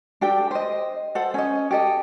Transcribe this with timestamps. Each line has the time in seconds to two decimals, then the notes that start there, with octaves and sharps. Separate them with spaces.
0.21 D4 G4 A4 G5
0.51 C5 D#5
1.15 A4 C5 F#5
1.34 C#4 D#5
1.71 G4 A4 D#5